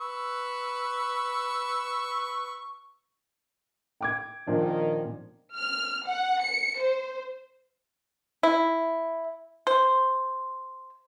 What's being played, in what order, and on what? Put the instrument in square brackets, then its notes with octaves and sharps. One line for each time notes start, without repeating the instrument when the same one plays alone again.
[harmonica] B4 C#6 E6
[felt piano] G5 D6 G#6
[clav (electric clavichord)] A#2 F3 D4 [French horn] D#3
[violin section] F6
F#5
C#7
C5
[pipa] E4
C5